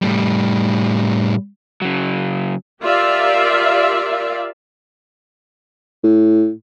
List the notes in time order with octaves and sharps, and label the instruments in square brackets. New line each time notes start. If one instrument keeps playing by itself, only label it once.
[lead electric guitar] A2 G3
[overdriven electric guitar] C#3 F#3
[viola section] F4 G4 A#4 D5 E5 F5
[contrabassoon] A2